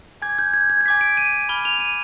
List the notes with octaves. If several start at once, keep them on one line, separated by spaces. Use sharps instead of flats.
G#5 D6 G6 G#6
G6
G#6
G#6
G#6
G#5 D6 G6 B6
D7
D#7
B5 D6 F6 G7
F7
D#7